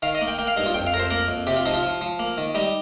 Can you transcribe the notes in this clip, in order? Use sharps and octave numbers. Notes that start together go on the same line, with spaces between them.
D#3 F5
D#5
A#3
G5
A#3 G5
F5
G2 D#4
F4
F2 G5
F5
F2 A#4
C5
A#3 A#4
F2
C3 G4
F4
F3 D#4
F4
F3
F3
A#3
D#3
G3 D#4